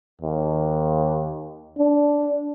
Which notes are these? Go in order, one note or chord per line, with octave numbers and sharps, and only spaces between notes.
D#2
D4